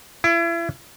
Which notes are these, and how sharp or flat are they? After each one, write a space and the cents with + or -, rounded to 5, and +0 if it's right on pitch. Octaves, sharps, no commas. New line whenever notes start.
E4 +35